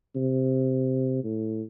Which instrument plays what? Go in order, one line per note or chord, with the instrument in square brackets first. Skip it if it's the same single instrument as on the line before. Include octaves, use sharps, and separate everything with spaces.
[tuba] C3
A2